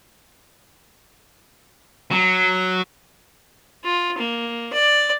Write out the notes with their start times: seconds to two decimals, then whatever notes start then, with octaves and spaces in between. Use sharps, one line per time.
2.11 F#3
3.84 F4
4.18 A#3
4.73 D5